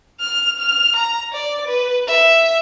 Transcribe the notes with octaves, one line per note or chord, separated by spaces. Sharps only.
F6
F6
A#5
D5
B4
E5